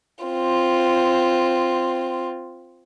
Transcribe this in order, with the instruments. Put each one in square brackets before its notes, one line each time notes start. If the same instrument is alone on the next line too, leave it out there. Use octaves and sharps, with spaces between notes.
[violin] C4 F4